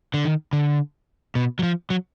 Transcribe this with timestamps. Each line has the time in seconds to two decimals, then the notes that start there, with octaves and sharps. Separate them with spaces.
0.14 D3
0.25 D#3
0.53 D3
1.35 B2
1.59 F#3
1.63 F3
1.90 F#3